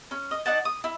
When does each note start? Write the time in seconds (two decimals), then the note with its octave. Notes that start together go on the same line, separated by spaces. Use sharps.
0.11 C#4
0.31 D#5
0.46 D4 D#4 F#5 A5
0.65 D#6
0.84 E4